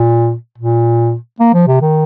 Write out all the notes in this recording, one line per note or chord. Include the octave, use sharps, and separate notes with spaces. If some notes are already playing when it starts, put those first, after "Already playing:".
Already playing: A#2
A#2
A#3
F3
C3
D#3